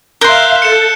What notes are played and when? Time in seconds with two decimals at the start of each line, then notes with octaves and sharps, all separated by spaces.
0.21 A#4 E5 F5 C6 F#6 G6 G7
0.62 A4 C#7 E7